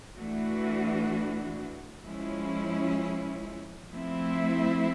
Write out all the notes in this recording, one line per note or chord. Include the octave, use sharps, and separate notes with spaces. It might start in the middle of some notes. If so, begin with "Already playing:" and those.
E3 A3 D4 F#4
F3 G#3 C#4 E4
F3 A3 C4 E4